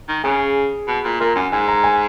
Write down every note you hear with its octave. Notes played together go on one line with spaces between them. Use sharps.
D#3
C#3 G#4
B2
A#2
A#2 A#4
F#2 G#5
G#2 G#5
A#5
G#5